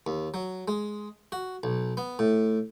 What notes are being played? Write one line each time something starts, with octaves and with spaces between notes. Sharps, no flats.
D#2
F#3
G#3
F#4
B1
B3
A2